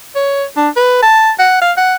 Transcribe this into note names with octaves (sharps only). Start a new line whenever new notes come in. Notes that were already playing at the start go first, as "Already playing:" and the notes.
C#5
D4
B4
A5
F#5
F5
F#5